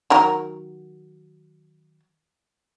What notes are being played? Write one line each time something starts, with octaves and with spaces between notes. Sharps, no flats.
D#3 F#3 A#4